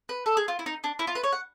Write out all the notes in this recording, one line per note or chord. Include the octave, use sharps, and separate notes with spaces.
B4
A4
G#4
F4
E4
D#4
D4
E4
F4
B4
C#5
F#5